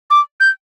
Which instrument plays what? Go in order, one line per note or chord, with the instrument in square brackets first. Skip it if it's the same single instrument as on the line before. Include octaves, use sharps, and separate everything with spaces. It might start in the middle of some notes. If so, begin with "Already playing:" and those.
[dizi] D6
G6